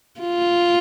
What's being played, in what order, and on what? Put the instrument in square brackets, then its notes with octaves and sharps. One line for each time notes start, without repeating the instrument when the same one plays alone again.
[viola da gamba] F4